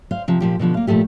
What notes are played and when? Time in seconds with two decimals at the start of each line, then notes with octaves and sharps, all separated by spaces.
0.11 C5 F5
0.28 C3 F3
0.40 A#2 F3 G4
0.59 B2 D3 F3 B3
0.74 A#3 F5
0.87 A#2 C#3 F3 A3 G4